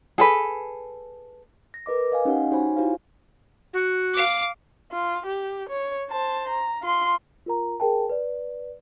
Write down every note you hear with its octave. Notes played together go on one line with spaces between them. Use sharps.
G#4 A4 B4
A#6
A#4 B4 D#5 D6
D#5 F5 G#5
C#4 D#4 G4 C#5 F#5
D#4 F#4 C5 C#5 G#5 B5
E4 F#4 G4 C5 F5
F#4
F5 D6
F4
G4
C#5
C5 A5
A#5
F4 C6
F4 A#4 A#5
G#4 A#4 G5 A5
B4 D5